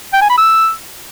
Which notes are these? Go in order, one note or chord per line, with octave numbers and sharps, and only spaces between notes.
G5
G#5
B5
E6